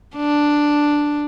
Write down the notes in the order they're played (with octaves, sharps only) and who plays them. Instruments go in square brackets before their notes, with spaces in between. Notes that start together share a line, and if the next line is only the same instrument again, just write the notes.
[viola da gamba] D4